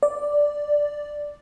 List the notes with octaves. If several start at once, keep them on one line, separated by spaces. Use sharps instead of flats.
D5